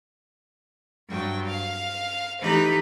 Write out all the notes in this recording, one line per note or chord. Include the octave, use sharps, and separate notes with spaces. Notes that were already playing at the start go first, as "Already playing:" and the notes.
G2 F#3 G5
F5
E3 A3 D#4 G4 B4 B5